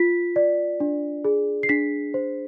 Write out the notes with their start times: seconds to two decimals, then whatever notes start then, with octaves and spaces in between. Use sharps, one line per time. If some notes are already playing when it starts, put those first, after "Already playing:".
Already playing: F4 B6
0.36 D5
0.80 D4
1.24 G#4
1.63 C7
1.69 D4 B6
2.14 C5